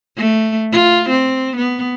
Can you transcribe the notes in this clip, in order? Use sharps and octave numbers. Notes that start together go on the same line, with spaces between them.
A3
F4
C4
B3